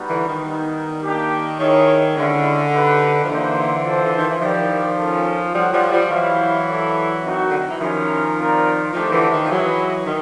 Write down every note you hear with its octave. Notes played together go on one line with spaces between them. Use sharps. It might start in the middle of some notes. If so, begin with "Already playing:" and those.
Already playing: G3 B3 D#4 F#4 B4
D3 E3
D#3
G3 B3 D#4
A#3 D4 G4
D#3 E4 G#4 C#5
D3 G#3 C#4 E4
D#4 G4 B4
F3
D3 E3 A#3 D#4 G4 C5 E5
F4 A4 C5 F5
D3
D#3
E3
D#3 F3 E4 G4 A#4 D5
C#4 F4 A4
F3 G3 F#4 A4 C#5 F#5
F3 G3
F3 G3
E3 F#3 E4 G4 C5 F5
E4 A4 D5
C4 D#4 F#4 A#4
D3
D#3
E3
D#3 F3 C#4 E4 G4 A#4
C4 F4 A#4 D5
D#3 F3 A3 D4 G4 C5
D3 E3
D#3
F3
E3 F#3 E4 G#4 B4 D#5 F#5
D#3